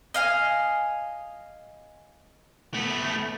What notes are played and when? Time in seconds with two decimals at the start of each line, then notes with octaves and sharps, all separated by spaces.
0.14 D#5 F5 G#5
2.74 A3 B3